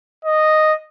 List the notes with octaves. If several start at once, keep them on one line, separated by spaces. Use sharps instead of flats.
D#5